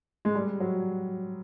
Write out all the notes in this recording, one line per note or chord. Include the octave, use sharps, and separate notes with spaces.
G#3
G3
F#3